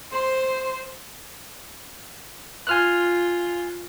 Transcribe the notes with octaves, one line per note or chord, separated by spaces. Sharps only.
C5 C6
F4 G#5 F6 F#6